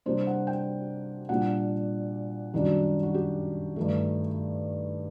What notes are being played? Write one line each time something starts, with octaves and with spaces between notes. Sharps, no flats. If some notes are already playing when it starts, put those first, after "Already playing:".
C3 G3 A#3 D4 C5
F#5
G5
A#2 G3 D4 F#5
F#2 D#3 G3 D4
F#4
G4
G2 D#3 A3